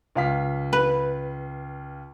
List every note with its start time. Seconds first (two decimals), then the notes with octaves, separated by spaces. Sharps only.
0.16 C#2 F5 B6
0.73 B4